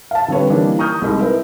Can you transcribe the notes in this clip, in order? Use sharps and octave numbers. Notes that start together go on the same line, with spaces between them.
F5 A5
D3 G3 C4 B4 C#5
E3 G3 A#3 D4 D#4
A#5 C#6 D#6 F6 G6
C2 G#3 D#4 E4
A#4 B4 E5